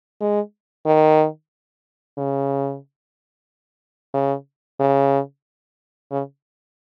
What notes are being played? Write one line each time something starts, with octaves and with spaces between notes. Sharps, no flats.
G#3
D#3
C#3
C#3
C#3
C#3